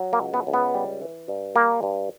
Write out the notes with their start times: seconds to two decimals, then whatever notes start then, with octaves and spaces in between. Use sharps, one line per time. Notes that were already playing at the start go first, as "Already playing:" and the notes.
Already playing: F#3
0.13 A#3
0.20 C#2
0.34 B3
0.47 C#2
0.54 B3
0.74 G3
1.02 E3
1.28 G2
1.55 G3 A#3
1.83 G2